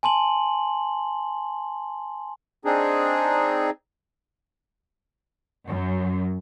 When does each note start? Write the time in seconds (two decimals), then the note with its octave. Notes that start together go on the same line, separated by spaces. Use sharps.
0.03 G#5 A5 C6 F#7
2.65 C4 D4 D#4 G#4
5.68 F#2